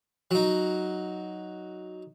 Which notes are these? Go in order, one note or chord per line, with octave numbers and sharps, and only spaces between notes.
F#3 D#4